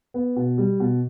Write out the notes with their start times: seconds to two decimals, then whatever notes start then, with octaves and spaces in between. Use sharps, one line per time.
0.14 B3
0.36 B2
0.58 G3
0.80 B2